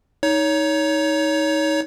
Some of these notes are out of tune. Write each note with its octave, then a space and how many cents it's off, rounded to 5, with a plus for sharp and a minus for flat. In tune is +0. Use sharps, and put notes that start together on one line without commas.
D#4 +15 C#5 +20